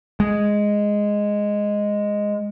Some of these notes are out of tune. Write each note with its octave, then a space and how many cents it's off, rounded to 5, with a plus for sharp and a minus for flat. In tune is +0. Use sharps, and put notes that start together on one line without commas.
G#3 -5